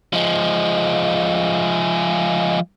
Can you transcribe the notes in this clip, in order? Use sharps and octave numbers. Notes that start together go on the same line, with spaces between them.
F3 G#3